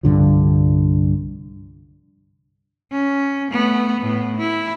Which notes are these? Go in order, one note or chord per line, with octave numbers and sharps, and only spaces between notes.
C2 G2 D3 F3
C#4
A3 B3
A2 B3
E4